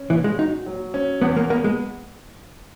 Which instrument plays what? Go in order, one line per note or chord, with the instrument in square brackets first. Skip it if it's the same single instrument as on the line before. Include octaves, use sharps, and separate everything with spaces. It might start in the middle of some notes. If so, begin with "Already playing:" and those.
Already playing: [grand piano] C#4
[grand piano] A#2 [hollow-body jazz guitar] E3
[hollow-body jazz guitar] G#3
[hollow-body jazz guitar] D#4 [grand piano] F#4
[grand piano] F#3
C#4
[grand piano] E2 [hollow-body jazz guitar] B3
[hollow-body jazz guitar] A#3
[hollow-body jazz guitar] A#3 [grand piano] B3
[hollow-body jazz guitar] G#3